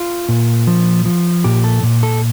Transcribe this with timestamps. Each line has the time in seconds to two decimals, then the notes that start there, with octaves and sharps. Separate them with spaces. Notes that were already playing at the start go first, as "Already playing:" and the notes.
Already playing: F4
0.29 A#2
0.67 F3
1.06 F3
1.44 A#2 G4
1.64 A4
1.83 A#2
2.03 A4